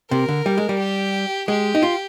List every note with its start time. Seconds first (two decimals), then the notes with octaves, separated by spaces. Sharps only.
0.11 C3 A#4
0.29 D3
0.46 G3
0.58 G#3
0.69 G3
0.80 G4
1.48 G#3 G4
1.75 D#4
1.82 F4